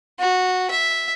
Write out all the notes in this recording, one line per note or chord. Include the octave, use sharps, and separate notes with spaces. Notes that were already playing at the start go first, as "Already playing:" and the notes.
F#4
E5